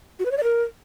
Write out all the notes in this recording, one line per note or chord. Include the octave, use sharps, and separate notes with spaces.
F#4
B4
C#5
D5
A#4